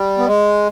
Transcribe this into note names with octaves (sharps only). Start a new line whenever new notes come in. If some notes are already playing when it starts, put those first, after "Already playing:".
Already playing: G3
B3
G#3